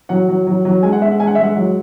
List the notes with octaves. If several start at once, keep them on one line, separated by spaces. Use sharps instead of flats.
F#3 F#5
F#3
F#3
F#3
G#3 G#5
F#5
G#3 E5
F#5
G#3 G#5
F#5
E5
G#3 F#5
F#3